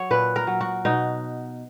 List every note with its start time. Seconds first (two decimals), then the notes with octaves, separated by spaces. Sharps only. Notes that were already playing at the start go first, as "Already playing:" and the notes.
Already playing: F#3 C#5
0.11 A#2 B4
0.36 A#4
0.47 F#3
0.61 F#4
0.85 B2 D#4